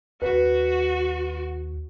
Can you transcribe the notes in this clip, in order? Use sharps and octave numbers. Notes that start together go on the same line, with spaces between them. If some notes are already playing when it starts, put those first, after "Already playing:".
D#2 F#4 B4